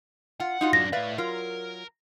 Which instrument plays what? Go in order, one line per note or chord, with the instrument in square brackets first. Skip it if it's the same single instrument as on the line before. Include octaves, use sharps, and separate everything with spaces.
[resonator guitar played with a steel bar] F4 [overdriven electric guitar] F#5
[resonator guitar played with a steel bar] D#4 F4 F#4
[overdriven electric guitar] F#2 D4 [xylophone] A#6
[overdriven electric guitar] A2 E5 [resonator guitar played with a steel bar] B4 D5 F5
[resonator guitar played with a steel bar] F#3 F4 [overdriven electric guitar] A#4